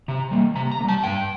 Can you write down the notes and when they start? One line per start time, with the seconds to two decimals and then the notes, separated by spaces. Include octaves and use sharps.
0.08 C3 A#5
0.31 G3 A#3
0.56 C3 A#5
0.72 A#5
0.81 A#3
0.84 G3 A5
1.03 G2 G5